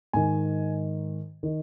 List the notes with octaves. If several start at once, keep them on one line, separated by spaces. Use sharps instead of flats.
G#2 D#3 G#5
D#3